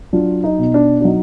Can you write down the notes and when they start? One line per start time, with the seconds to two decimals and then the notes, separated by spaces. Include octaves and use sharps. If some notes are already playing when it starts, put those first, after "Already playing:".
0.13 F#3 D4 F4
0.44 D#4
0.59 B2
0.74 D4
1.00 D4
1.04 F#3 D#4